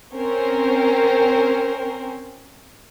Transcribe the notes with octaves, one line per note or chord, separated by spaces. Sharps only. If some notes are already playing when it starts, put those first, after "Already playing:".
C4 C#4 A#4 C5